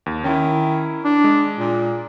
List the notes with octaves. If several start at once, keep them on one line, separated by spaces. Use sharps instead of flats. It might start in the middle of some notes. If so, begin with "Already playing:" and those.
D#2
D#3 C#4 E4
D4
G#3
A#2